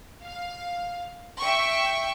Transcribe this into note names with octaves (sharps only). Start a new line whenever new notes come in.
F5
E5 G5 C#6